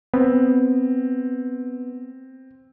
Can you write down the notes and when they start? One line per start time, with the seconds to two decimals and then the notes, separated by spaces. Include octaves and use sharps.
0.14 B3 C4